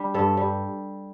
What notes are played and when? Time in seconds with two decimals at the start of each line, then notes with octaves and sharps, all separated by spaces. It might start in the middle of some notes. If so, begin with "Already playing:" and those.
Already playing: G3 D4
0.14 G2 A4
0.37 G3